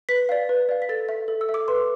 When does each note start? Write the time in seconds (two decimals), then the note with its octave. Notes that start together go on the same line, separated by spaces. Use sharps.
0.09 B4 B6
0.29 D5 F5
0.49 B4
0.69 D5 F5
0.82 B6
0.89 A4 A6
1.09 E5
1.28 A4
1.41 E6
1.49 E5
1.54 D6
1.68 B4 C6